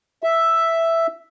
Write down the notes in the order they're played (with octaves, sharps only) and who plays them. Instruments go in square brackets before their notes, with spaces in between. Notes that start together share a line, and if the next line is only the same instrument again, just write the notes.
[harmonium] E5